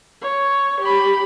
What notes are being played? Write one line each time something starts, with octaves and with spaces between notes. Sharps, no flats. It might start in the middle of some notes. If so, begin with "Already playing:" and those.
C#5
G4 B5